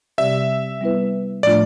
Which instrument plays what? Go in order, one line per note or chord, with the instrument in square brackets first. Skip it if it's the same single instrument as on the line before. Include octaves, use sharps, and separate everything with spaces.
[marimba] C3 G3 C4 G4 D5 [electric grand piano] E5
[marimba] G3 B3 E4 B4
[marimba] A2 F3 A3 D4 F4 [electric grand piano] D5